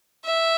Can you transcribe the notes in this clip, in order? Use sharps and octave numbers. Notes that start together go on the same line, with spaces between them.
E5